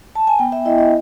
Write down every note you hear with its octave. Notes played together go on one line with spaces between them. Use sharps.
A5
G#5
B3 G5
E5
E4 D#5
D#5